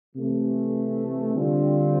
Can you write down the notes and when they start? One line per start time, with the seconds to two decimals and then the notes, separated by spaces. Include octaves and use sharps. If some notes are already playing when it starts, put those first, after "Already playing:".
0.15 C3 E3 A3
1.35 D3 G3 C4 F4